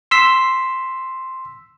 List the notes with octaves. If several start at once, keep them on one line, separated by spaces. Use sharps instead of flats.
C6 E6 B6